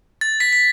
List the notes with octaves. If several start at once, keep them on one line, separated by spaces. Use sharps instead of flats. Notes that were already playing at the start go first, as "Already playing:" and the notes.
A6
B6
B6